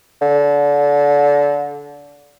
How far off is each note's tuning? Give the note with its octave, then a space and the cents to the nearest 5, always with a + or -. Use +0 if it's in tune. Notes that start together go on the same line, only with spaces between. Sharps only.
D3 -25